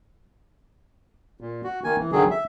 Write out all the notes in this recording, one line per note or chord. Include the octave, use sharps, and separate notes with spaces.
A#2
F#4
D#3 A#3 G#5
E3
D3 D#3 F#3 G#4
E5